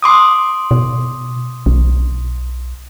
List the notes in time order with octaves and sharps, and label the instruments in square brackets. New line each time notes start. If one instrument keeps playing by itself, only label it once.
[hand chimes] C6 D6 D#6
[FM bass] B2
B1